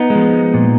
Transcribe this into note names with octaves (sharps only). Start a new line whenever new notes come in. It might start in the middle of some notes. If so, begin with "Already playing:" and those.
Already playing: B3 D#4
G#3
F3
A#2